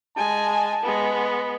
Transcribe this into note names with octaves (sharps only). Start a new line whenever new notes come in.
G#3 G#5 A5
G#3 B3